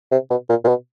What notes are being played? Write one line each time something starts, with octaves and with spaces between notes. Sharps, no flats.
C3
B2
A#2
A#2
B2